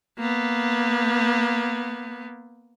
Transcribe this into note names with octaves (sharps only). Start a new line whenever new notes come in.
A#3 B3